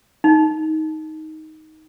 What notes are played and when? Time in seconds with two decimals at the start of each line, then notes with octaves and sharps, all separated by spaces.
0.24 D#4